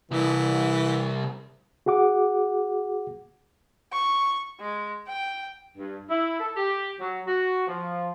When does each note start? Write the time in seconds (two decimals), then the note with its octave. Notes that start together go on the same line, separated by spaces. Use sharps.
0.11 C2 E3
1.86 F#4 G#4 F#5 D6
3.92 C#6
4.61 G#3
5.07 G5
5.78 G2
6.09 E4
6.39 A4
6.56 G4
7.00 F#3
7.27 F#4
7.67 F3